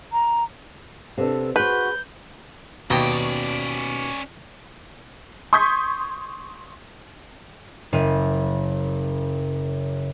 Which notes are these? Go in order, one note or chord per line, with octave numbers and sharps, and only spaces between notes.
A#5
C3 B3 D4 A4
F#4 G#4 B4 C5 G6
D#2 B2 C#4 D5 G5 A#5
C6 C#6 D#6 G6 G#6 B6
F#1 C#3 D#7